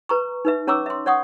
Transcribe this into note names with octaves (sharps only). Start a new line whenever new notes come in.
B4 A#5 C#6
D#4 B4 E5
C#4 C#5 A#5 C#6 D6 E6
E5 C6
C#5 D5 F#5 C#6 D#6